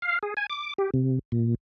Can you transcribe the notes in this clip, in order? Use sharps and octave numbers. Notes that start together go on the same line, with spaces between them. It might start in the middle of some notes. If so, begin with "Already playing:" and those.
F5
G#4
G#5
D6
G4
C3
A#2